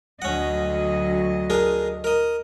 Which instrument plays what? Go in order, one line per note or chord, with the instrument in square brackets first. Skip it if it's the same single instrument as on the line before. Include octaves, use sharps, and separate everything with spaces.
[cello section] D2 F#3 D#5 [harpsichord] C#4 F#5
[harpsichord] D4 G#4 A#4
A#4 D#5